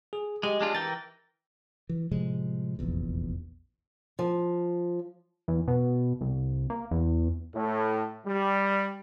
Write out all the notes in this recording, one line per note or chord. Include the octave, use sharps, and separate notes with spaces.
G#4
G#3 G4 D#5
G#3 D4 F4
E3 A#4 G5 A6
E3
A2 C3 F3 G#3
F1 A#1 E2
F3
E2
B2
C2
A#3
E2
A2
G3